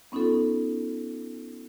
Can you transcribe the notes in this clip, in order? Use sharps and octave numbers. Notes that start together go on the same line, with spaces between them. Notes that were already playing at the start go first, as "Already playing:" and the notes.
B3 C#4 D#4 F4 A4